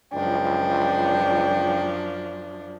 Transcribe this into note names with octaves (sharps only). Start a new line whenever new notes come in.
C#2 F#2 F3 D4 G5